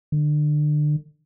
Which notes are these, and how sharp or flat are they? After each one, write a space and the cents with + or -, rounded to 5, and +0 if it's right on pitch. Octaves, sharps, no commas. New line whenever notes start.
D3 +30